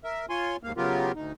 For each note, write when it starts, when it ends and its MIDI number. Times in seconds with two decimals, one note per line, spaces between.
0.04 0.26 70
0.04 0.26 76
0.30 0.57 65
0.30 0.57 73
0.30 0.57 80
0.30 0.57 84
0.63 0.72 39
0.63 0.72 44
0.63 0.72 58
0.63 0.72 77
0.77 1.12 49
0.77 1.12 54
0.77 1.12 59
0.77 1.12 65
0.77 1.12 67
0.77 1.12 70
1.15 1.32 38
1.15 1.32 63